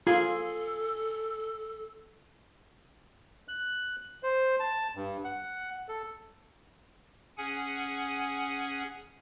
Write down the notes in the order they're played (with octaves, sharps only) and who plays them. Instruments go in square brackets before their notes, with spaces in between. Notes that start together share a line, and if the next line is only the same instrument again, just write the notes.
[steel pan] F4 [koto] G#4 [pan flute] A4
[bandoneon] F#6
C5
A5
G2
F#5
A4
[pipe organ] C#4 G#4 F#5 G#5